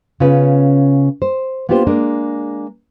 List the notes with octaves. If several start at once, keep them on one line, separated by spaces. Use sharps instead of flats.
C#3 B3 C#4 F4 B4
C5
A#3 B3 D4 F4 G4 C5
G#3 A#3 D4 A#4